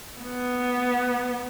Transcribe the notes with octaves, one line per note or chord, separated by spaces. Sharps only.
B3